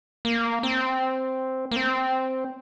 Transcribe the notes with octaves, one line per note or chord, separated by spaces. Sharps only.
A#3
C4
A#3
C4